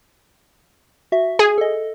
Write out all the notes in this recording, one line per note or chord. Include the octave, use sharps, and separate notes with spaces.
F#4 E5
G#4
A4 D#5